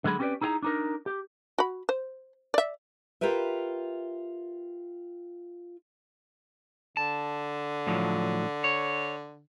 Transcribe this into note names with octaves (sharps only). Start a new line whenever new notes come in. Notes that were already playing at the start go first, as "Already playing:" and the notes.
D3 F#3 G#3 G#4 B5
C4 C#4 G4 A4 B4 D5
D#4 E4 G#4 G5 A#5
D4 D#4 A#4
G4
F#4 B5
C5
D5 E5
F4 G4 A#4 B4 E5
D3 A5
A2 F3 F#3
C#5